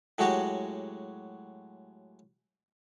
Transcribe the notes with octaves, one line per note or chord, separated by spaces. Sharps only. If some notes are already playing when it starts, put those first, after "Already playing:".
A2 F#3 G#3 F#4 G4